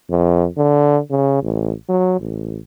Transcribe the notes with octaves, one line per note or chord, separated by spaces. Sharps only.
F2
D3
C#3
A1
F#3
A1